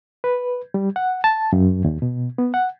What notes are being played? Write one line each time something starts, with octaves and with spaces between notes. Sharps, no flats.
B4
G3
F#5
A5
F#2
D#2
B2
B3
F#5